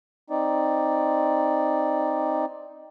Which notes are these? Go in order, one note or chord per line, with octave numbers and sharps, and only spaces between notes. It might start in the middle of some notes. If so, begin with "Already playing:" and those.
C4 D#4 D5